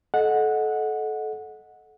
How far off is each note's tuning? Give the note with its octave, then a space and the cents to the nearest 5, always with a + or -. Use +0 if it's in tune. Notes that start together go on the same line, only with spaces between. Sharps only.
A4 -25 D#5 +0 F#5 -15